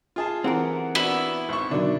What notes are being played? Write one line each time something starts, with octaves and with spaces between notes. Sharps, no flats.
F4 G#4 A5
E3 C4 G4 A#4 F#5
B3 D4 E4 F#4
G#1 C#6
B2 D3 D#3 F#3 D4